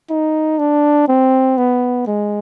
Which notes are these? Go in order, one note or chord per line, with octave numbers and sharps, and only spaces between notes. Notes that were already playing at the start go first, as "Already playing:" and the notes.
D#4
D4
C4
B3
G#3